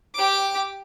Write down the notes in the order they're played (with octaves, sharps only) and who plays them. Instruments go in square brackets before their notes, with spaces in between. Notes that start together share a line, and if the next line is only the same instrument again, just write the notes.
[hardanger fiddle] G4 D6